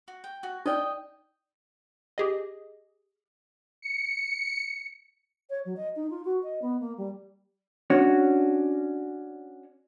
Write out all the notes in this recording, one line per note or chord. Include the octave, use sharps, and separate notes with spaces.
F#4
G5
F#4
D#4 D5 D#5 G5
G4 G#4 D#5
C#7
C#5
F#3
D#5
D#4
F4
F#4
D#5
B3
A#3
G3
C#4 D4 F#4 C#5